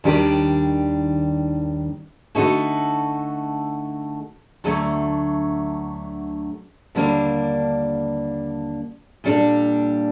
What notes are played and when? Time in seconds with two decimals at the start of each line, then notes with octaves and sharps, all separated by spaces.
0.04 D#2 D#3 G3 D4 G4
2.35 D3 A3 D#4 F#4 A4
4.64 D2 D3 F#3 A3
6.95 D#2 D3 G3 A#3 D4
9.24 A#2 G3 D4 A4